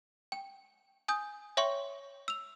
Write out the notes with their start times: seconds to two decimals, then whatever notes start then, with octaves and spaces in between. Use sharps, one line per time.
0.32 G5
1.08 G#5 D#6 G6
1.57 C#5 E5 G5 C6 C#6
2.28 E6 F7